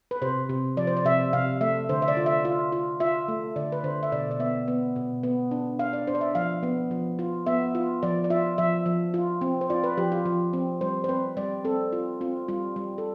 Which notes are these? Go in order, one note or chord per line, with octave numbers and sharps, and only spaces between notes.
B4
C3 C5
C3
F3 D5
C5
D5
C3 E5
C3 F5
A3 E5
D3 C5
E5
D5
F4
E5
F4
F4
F4 E5
A3
D3 D5
B4
D3 C5
E5
B2 D5
D5
B3 E5
B3
B2
B3
D4
D4 F5
D5
D4 C5
D5
E5
F3 F5
B3
F3
F4
B3 E5
F4
F3 D5
D5
F4 E5
F3 E5
F3
F4
C4
C5
F4 D5
B4
F3 G4
F4
F3
C4
G3 C5
C5
C4 B4
G3 D5
C4 A4
F4
C4 F4
G3 F4
G3
A4